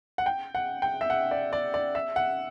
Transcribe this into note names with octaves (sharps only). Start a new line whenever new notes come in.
F#5
G5
F#5
G5
E5
F#5
D5
D5
D5
E5
F#5